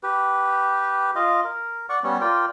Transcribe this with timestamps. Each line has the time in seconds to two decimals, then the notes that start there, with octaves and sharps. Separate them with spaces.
0.03 G4 B4
1.16 F4 D#5 F5
1.44 A#4
1.89 D5 F#5 C#6
2.03 G3 B3 C#4
2.21 F4 A#4 D5 G5